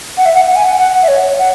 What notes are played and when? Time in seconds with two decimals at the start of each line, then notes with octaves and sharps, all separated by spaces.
0.17 F#5
0.25 E5
0.35 F#5
0.46 F#5
0.56 G#5
0.66 F#5
0.78 F#5
1.02 E5
1.08 C#5
1.39 F#5